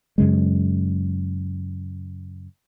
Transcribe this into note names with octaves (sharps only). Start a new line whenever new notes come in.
F#2 C#3 G#3